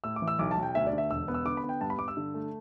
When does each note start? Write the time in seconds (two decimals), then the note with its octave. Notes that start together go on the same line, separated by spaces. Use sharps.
0.04 A2 E6
0.16 D6
0.22 E3
0.28 E6
0.39 B1 D6
0.51 A5
0.57 B1
0.63 G5
0.75 D2 E5
0.87 D5
0.93 D3
0.98 E5
1.11 E1 E6
1.28 B3
1.34 E6
1.45 D3 D6
1.57 B5
1.64 B3
1.69 G5
1.81 G2 A5
1.90 B5
1.98 G2 D6
2.08 E6
2.17 D3
2.34 A3